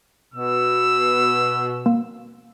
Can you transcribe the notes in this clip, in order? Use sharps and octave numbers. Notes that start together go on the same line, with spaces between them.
B2 E6
A#3